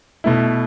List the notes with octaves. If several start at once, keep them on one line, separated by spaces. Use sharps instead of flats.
B2 A3 E4